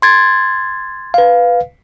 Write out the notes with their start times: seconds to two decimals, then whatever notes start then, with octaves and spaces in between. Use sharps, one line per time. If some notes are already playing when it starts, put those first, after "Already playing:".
0.02 C6 G#6 A6
1.14 B4 F5